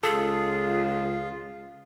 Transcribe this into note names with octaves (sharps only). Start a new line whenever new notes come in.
C#2 F4 G#4 A4